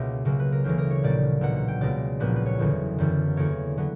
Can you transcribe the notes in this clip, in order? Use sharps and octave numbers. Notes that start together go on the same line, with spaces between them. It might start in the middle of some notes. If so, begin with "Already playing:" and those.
Already playing: C#2 B2 A#3 G4 E5
C#2 C#3 F#3 A#3
B4
A#4
D2 C#3 E3 A#3 G4
A#4
C#5
A#1 A#2 G3 A#3 D5
B1 A#2 A#3 F#5
F#5
G5
C#2 B2 A#3 D5
A#1 A#2 G3 B3 B4
B4
C#5
F#1 E2 D3 F#3
F#1 F#2 E3 G3
E2 D3 A#3 C#5
D3 F#3 B3